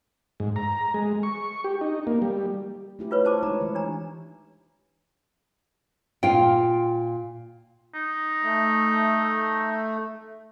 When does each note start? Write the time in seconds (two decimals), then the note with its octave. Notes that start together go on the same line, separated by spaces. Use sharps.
0.40 G#2
0.56 A#5
0.94 G#3
1.23 C#6
1.64 G4
1.81 D#4
2.07 A#3
2.22 G3
2.99 A3 E4 G4
3.11 F4 B4 C#5
3.25 E4 C5 C#5 A5 D6
3.43 G#3 D#4 C#5 A#5
3.61 E3
3.75 D4 A#5
6.23 A#2 F4 G5
7.94 D#4
8.44 A3